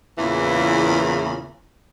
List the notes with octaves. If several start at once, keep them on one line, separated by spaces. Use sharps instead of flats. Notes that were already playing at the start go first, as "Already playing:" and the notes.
E2 A#2 C#3 E3